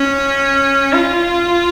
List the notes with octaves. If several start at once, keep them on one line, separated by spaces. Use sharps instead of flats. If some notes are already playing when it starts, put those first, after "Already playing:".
Already playing: C#4
F4